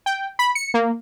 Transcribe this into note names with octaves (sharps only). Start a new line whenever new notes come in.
G5
B5
C#7
A#3